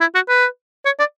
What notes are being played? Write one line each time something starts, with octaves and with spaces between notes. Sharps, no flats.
E4
F#4
B4
C#5
D5